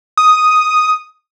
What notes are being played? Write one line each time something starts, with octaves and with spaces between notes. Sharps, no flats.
D#6